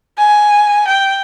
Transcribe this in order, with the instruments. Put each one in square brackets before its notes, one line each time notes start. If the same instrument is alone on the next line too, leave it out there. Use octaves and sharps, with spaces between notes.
[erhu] G#5
G5